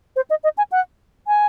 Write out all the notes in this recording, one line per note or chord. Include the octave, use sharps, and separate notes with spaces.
C5
D#5
D#5
G#5
F#5
G#5